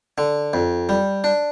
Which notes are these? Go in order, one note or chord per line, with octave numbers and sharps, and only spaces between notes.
D3
F2
G3
D4